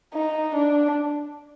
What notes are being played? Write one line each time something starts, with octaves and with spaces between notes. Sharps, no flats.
D#4
D4